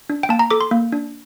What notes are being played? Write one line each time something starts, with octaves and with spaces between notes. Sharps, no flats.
D4
G5
A#3 A5
A#5
A4 D6
C6
A#3
D4